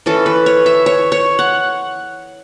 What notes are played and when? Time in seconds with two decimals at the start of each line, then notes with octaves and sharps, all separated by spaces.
0.06 E3 C#4 A4
0.26 B4
0.46 C#5
0.66 E5
0.86 C#5
1.12 C#5
1.39 F#5